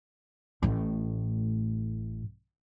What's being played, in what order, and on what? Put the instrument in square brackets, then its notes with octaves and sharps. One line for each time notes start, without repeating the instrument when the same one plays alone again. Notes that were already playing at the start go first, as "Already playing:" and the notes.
[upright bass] A1 A2